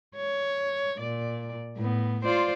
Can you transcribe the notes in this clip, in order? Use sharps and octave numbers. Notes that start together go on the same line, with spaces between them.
C#5
A#2 D5
A2 B3
F4 C5 D5